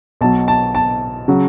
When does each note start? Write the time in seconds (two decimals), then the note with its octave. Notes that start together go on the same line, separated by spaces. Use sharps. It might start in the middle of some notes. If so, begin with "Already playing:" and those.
0.21 B1 B2 F#3 A5
0.48 A5
0.75 A5
1.28 C#3 F#3